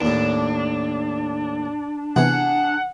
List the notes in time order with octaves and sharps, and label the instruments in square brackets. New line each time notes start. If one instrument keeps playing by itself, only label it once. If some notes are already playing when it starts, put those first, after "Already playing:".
[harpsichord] D#2 A2 [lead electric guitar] D4
[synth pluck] C3 E3 B3 [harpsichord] G#4 [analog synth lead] F#5